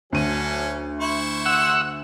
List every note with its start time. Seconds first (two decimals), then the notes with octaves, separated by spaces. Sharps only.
0.12 D2 D3 F#3 C#4 D#7
1.00 E4 C5 C#6
1.46 F#5 E6